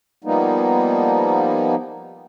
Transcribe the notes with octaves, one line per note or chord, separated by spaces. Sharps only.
F3 G3 A#3 B3 D#4